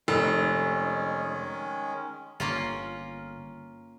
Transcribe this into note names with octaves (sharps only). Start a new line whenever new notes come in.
F1 D#3 G#3 C#4
G1 A#3 C#4 F4